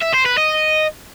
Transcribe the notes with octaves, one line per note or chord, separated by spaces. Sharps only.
E5
C5
B4
D#5